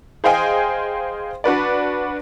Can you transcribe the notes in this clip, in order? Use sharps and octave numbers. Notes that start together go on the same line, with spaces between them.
G#4 C5 D#5 F5 G5 G#5
D4 F#4 B4 D5